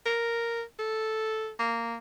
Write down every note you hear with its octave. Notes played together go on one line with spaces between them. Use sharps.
A#4
A4
A#3